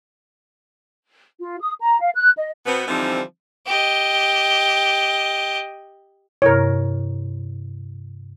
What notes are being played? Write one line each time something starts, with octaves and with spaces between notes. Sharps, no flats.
F4
D#6
A#5
F5
F#6
D#5
B2 B3 C4
D3 E3 F3 G3 C4 D#4
G4 D#5
G2 C3 E4 A#4 C#5